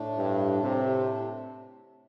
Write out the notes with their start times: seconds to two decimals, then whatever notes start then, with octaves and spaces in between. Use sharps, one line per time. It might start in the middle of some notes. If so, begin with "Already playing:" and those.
Already playing: A2 A3 D4
0.18 G2
0.63 C3